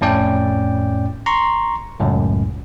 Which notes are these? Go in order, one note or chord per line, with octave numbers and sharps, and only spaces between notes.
F2 A2 C#4 D5 G5
A#5 C6 C#6
C#2 F#2 A2